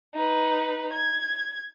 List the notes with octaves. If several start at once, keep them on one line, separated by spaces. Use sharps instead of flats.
D#4 B4
G#6